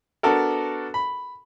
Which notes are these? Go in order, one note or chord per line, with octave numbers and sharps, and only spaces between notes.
B3 D4 F#4 A4 A#4
B5